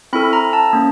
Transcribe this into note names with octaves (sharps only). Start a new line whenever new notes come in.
C4 E4 A4 B5
A#5
A5
A#3 C#4